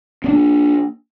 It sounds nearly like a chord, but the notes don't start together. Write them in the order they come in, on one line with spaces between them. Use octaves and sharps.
C4 D4 A#3